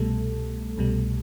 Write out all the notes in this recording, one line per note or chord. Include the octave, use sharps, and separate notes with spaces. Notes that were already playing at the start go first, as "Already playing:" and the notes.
Already playing: C2 B2 G3 A3 A4
C2 B2 G3